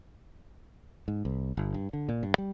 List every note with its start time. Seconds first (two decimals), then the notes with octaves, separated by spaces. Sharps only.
1.08 G#2
1.25 C2
1.57 G1
1.74 G2
1.93 D3
2.09 A#2
2.23 G2
2.38 G3